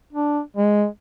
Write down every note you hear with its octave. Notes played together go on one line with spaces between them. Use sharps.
D4
G#3